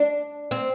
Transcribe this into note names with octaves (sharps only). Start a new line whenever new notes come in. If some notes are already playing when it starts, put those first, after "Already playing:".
Already playing: D4
C4